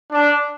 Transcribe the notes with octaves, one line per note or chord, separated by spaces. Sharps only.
D4